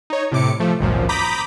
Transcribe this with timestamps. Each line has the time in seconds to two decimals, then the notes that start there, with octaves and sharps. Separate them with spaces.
0.10 D#4 C#5
0.31 A2 C3 D6 C#7
0.60 F3 A3
0.80 G#1 C#2 F#2 A#2 F3
1.09 A#5 B5 D6 D#6 G6 B6